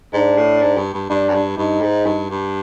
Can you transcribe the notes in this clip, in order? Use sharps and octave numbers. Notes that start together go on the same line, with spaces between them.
G#2 D4
A2
G#2
G2
G2
G2 D4
F#2
G2
G2 D#4
G#2
G2
G2